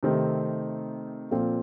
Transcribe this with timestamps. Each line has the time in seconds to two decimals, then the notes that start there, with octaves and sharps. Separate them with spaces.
0.03 C3 D#3 A3 C4 D#4
1.31 A#2 F3 C4 F4 A4